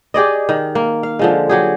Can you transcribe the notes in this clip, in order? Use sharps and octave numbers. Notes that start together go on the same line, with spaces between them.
G4 G#4 D5 D#5
D#3
A#3
F5
D3 F3 G#3
F#3 G4 G#4